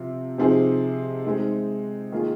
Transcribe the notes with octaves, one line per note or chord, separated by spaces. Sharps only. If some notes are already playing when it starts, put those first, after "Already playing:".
Already playing: C3 F3 C4 F4
C3 F3 C4 D#4 G#4
G#3 C4 D#4
D#3 A#3 F4 G#4